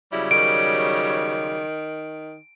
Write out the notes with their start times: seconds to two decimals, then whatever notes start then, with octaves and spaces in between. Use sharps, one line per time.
0.13 C#3 F#3 G3 E4
0.31 D#3 D7